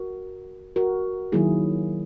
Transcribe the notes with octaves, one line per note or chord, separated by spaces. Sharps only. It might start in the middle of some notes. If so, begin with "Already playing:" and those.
Already playing: F#4 A#4
F#4 A#4
D#3 F#3 A#3 E4 G#4